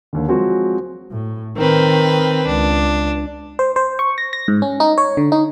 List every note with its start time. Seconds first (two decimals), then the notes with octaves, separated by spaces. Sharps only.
0.13 D#2 D3
0.28 F3 F#3 G#3 C4 F#4
1.11 A2
1.57 D#3 C4 B4
2.47 C#2 D4
3.59 C5
3.76 C5
3.99 C#6
4.18 A#6
4.33 A#6
4.48 G#2
4.62 C#4
4.80 D#4
4.98 C#5
5.17 D3
5.32 D#4